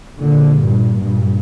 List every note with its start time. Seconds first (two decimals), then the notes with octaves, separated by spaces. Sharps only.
0.20 A#2 D3
0.61 G2 A#2
1.03 G2 A#2